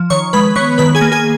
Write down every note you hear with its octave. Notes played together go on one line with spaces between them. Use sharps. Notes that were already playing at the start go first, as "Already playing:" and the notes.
Already playing: F3
D#3 C#5 C#6
G#3 B4 B5
B3 C#5 C#6
D#3 B4 B5
G#4 G#5
A#3
G#4 G#5